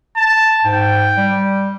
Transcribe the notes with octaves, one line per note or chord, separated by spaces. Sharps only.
A5
G#2 G5
G3